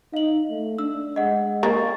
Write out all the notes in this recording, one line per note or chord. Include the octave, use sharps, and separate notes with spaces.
D#4 F5 F#7
A3
D4 E6
G#3 D#5 F#5
A#3 C#6 A6